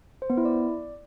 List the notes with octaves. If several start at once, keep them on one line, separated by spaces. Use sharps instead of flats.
C5
B3
E4
D5